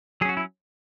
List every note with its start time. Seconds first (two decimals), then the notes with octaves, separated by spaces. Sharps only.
0.21 F#3 G#4
0.25 C#4 F#4
0.37 E4